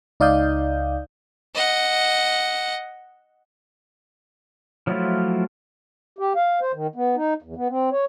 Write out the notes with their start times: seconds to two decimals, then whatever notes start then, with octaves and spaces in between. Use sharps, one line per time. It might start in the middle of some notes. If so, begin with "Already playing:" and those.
0.20 C#2 D#4 D5 F5 D#6 G6
1.55 D#5 F#5
4.87 F3 F#3 A3 E4 F4
6.19 G4
6.36 F5
6.61 C5
6.73 D#3
6.95 B3
7.16 D#4
7.42 E2
7.56 B3
7.69 C4
7.91 C#5